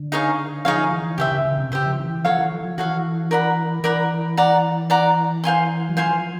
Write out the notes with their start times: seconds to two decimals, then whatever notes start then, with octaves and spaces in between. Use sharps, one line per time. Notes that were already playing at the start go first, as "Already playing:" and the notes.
Already playing: D3
0.12 D#4 G#4 C#5 F5
0.65 F3 D#4 G#4 C#5 F5
0.91 E3
1.18 C#3 G4 C5 E5
1.31 C#3
1.45 C#3
1.58 C3
1.72 C#3 G4 C5 E5
1.86 F3
1.98 E3
2.25 F3 F#4 A4 C#5 F5
2.38 E3
2.51 F3
2.65 F3
2.78 E3 F#4 A4 C#5 F5
3.31 A#4 D5 F#5 B5
3.84 E3 A#4 D5 F#5 B5
4.37 D5 F#5 A#5
4.90 D5 F#5 A#5
5.44 C5 F5 G#5 C6
5.89 F#3
5.96 F3 C5 F5 G#5 C6